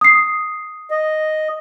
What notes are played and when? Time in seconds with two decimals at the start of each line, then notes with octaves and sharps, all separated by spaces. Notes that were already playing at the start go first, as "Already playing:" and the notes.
0.01 D#6 C7
0.91 D#5